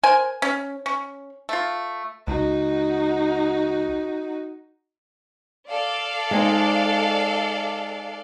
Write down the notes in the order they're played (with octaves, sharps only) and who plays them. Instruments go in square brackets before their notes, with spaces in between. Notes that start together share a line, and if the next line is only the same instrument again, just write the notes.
[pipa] A#4 C5 G#5
C#4
C#4
A3 F4
[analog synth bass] C#2 [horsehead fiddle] D#4 F#4
[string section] A4 D5 F5
[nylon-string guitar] G#3 C4 D#4